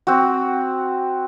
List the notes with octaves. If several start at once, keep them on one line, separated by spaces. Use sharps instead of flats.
C4 F#4